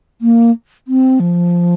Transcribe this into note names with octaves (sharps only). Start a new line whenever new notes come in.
A#3
C4
F3